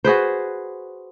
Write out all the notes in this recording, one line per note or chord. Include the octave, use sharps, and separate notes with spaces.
F#4 G#4 B4 C5